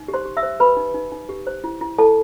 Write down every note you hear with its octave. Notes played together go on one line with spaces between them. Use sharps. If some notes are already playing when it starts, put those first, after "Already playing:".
Already playing: D#4
G4
C5 C6
G4
E5 E6
C5
G4 B4 B5
D#4
D#4
D#4
G4
C5
E4
E4
E4 A4 A5